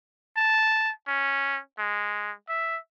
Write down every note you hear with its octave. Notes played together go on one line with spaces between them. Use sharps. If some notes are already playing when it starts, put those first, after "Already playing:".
A5
C#4
G#3
E5